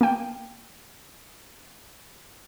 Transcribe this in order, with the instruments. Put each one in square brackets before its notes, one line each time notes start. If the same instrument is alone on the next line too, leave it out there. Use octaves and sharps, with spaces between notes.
[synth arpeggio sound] A#3 G5